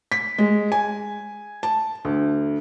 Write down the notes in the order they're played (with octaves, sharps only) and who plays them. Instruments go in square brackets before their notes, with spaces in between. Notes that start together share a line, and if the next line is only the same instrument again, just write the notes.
[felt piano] B6
G#3
G#5
A5
D2